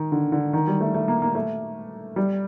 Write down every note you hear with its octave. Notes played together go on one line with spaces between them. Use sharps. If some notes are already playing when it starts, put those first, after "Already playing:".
Already playing: D#3
D3
D3
D#3
G3
A3
A3
A#3
A#3
A3
G3